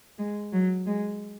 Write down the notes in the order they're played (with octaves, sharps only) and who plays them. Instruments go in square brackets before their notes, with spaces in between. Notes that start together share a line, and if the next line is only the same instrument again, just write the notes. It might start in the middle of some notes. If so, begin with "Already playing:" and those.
[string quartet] G#3
F#3
G#3